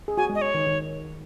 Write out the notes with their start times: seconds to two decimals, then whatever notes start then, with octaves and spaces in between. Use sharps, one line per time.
0.08 G#4
0.17 F#4 G#5
0.29 G#3
0.35 D#5
0.42 C#5
0.54 D#3
0.67 D#3